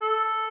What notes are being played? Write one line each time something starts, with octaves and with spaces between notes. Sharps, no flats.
A4